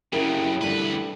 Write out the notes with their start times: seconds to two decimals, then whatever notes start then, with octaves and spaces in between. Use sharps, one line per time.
0.13 F#2 C#3 E4 G4 A#4
0.61 D2 G3 D4 A4 B4